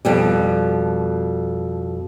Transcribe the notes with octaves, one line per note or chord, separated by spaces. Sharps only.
F2 B2 G3